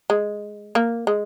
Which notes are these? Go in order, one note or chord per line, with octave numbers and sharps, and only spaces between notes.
G#3
A#3
G#3